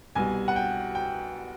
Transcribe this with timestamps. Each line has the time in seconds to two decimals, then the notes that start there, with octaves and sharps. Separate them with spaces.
0.15 C2 B2 G3 G#5
0.48 F#5
0.56 G5
0.95 G5